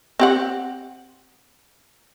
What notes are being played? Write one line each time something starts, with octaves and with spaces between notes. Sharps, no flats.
C4 G4 F#5